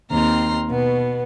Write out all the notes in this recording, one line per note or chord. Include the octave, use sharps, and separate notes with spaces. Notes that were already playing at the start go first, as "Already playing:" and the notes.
D#2 C4 A#5 C6 F6
B2 B3